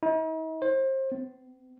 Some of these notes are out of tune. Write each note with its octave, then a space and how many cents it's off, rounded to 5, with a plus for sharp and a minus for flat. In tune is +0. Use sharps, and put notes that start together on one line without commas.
D#4 +45
C5 +30
C4 -45